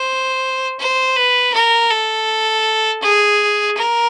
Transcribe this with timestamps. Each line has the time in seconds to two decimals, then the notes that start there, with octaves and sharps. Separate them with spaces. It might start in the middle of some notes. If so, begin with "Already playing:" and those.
Already playing: C5
0.79 C5
1.16 B4
1.53 A#4
1.90 A4
3.03 G#4
3.77 A#4